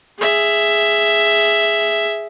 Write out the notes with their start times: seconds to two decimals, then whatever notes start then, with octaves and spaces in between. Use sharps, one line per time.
0.19 G#4 E5